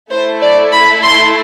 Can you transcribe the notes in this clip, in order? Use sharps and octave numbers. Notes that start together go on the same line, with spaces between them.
A3 E4 A4 C5
D5
B5
C6